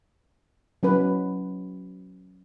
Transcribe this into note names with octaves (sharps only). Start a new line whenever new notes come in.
F#3 C#4 B4